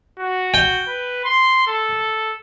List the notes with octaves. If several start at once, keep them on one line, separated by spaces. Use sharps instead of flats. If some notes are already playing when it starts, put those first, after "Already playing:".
F#4
G5
B4
C6
A4